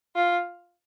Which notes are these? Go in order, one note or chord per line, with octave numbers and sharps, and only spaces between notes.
F4